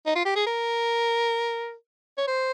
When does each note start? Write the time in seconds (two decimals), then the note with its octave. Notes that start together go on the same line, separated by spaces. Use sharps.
0.06 D#4
0.16 F4
0.25 G4
0.36 G#4
0.47 A#4
2.18 C#5
2.28 C5